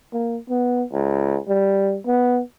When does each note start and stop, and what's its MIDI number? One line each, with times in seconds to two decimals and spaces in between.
0.13 0.38 58
0.50 0.83 59
0.93 1.37 37
1.48 1.98 55
2.07 2.41 59